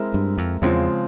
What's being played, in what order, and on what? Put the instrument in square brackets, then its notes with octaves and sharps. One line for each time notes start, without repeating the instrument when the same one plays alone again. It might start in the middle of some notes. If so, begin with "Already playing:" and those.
Already playing: [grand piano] G#3 C4 E4 A#4 E5
[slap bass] G2
F2
[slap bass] E2 [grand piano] C#3 F3 G#3 C4 F4